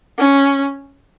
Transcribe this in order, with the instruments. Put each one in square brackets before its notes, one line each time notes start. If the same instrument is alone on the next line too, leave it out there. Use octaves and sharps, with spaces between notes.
[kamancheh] C#4